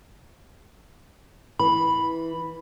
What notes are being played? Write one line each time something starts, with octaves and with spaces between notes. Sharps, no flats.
E3 B5